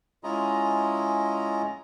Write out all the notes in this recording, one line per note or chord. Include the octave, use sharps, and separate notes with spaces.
G#3 C#4 E4 F4 D#5 A#5